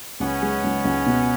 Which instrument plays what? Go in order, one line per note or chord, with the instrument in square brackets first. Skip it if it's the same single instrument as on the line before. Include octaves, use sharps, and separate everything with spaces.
[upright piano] C#2 [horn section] B3 C#4
[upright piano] G#3
C#2
C#2
B2